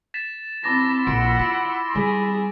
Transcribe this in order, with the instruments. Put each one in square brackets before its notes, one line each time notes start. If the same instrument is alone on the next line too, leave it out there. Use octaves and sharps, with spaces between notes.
[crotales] A6 B6 E7
[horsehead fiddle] C4 A5 [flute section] E4 B5 C6 [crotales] D6 A6 A#6
[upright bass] A#1 [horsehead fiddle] F#5 [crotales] D7
[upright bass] F4 [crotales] B6
[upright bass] G3 [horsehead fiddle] G#4